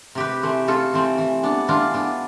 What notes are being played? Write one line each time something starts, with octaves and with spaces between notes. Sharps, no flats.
C3 G4 B4
E3 A3 C4
C3 F4 A4
E3 A3 C4
E3
B3 D4
E3 D4 F4
B3 D4